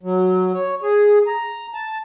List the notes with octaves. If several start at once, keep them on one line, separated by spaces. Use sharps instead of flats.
F#3
C#5
G#4
A#5
A5